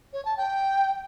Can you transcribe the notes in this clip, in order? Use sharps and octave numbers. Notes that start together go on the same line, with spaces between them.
C#5
A5
G5